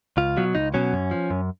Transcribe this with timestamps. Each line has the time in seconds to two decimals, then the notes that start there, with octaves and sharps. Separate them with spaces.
0.17 C#2 F4
0.37 B2 F#3
0.55 C#2 D#4
0.74 B2 F#3 C#4
0.93 F#2
1.11 F3
1.30 F#2